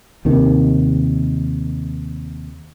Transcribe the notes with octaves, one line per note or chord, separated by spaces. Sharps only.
D#2 C3 D#3